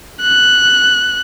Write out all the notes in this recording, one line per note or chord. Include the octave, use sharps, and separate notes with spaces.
F#6